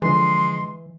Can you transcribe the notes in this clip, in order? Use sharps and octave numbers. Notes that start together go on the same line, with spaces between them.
D3 E3 F3 G#3 G#4 C6